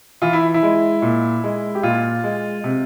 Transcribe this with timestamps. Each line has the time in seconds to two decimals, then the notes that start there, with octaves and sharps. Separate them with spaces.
0.22 E3 F4
0.33 E4
0.54 E4
0.63 G#3
1.02 A#2
1.44 G#3
1.75 G4
1.83 A#2 F4
2.24 G#3
2.64 C3